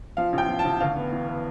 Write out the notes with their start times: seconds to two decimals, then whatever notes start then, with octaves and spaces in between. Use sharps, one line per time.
0.17 F3 F5
0.33 A1 G5
0.48 F3
0.59 A5
0.65 A1
0.80 D2 F5
0.96 B3
1.12 E3
1.28 B3